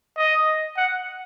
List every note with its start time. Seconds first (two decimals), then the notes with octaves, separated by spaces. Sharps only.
0.17 D#5
0.77 F#5